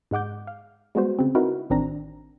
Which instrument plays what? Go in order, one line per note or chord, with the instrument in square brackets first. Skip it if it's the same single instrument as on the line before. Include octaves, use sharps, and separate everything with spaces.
[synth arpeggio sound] G#2 G#3 F#5 D6 G6
F5
G3 G#3 B3 F#4 C5
C#3 C4
C4 D#4 E4 F#4 A#4 B4
A1 D#3 C4 D4 A#5